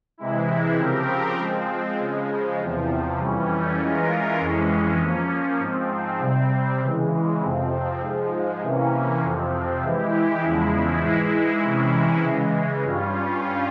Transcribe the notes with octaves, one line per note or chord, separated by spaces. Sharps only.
C3 E3 G#3 E4
C#3 F3 C4 G4 A#4
F3 G#3 C4
C#3 F3 G#3
E2 C3 F3
F2 E3 G3 C#4
E3 G#3 C#4 F4 A#4
F2 E3 G#3 C#4
F3 A#3 C#4
G#2 F3 C4
C3 G3 C4
C#3 E3 G#3
F2 C3 F3 C4
G#2 F3 G#3
C3 E3 A#3 C#4
F2 C3 F3 C4
E3 G#3 E4 G4
E2 C#3 F3 G#3 E4
G#2 E3 G#3 E4
C3 E3 G#3 C#4 E4
C#3 E3 G#3
G2 G3 C#4 F4